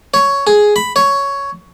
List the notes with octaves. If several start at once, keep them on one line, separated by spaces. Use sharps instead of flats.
C#5
G#4
B5
C#5